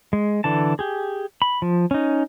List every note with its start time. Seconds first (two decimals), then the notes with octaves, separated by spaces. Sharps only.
0.13 G#3
0.44 D3 E3 A5
0.79 G4 G#4
1.42 B5
1.62 F3
1.91 C#4 D#4